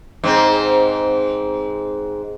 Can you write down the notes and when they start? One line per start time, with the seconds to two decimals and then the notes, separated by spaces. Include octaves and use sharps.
0.24 G#2 C4